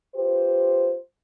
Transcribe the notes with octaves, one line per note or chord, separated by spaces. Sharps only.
F4 G4 B4 C5